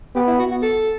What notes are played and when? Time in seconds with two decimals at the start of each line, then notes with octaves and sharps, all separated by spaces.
0.16 B3 G4
0.27 E4
0.39 F#4
0.51 F#4
0.62 A4